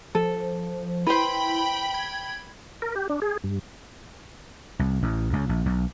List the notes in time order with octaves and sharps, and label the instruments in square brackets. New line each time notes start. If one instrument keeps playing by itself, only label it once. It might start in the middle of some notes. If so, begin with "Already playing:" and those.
[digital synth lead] F3 [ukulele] A4
[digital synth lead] E4 [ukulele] B4 C5 [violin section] G5 B5
[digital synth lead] G#6
[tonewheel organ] A#4
G4
D4
G#4
G2
[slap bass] C2
A1
C#2
A#1
B1